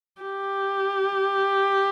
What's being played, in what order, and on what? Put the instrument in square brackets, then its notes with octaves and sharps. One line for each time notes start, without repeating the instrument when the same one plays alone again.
[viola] G4